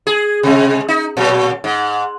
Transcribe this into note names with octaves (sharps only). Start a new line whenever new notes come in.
G#4
C3 G#3
D#4
A#2 F#3
G#2